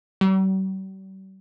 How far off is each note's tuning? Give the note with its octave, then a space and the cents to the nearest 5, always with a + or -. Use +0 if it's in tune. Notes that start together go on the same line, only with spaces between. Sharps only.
G3 -45